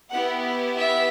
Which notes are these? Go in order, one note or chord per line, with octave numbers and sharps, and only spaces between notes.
B3 E4 G4 F#5
E5